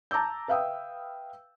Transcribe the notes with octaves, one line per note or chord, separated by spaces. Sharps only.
A5 A#5 D6 E6 G6
B4 E5 F5 G5 D#6 E6